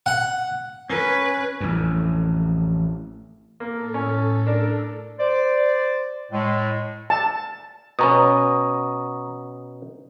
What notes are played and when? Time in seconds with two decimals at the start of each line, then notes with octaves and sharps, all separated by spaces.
0.06 F#5
0.90 C#4 B4
1.60 A1 F2
3.60 A2 A#3 A4
3.94 C#4
4.47 D4 A#4
5.19 C5 D5
6.32 A2 G#3
7.10 A5
7.99 B2 B3 C#4 A#5 C#6 D#6